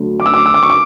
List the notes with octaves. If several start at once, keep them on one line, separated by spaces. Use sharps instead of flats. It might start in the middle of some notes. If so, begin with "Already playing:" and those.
Already playing: D2 D3 F#3
D6
E6
D6
E6
D6
C#6
D6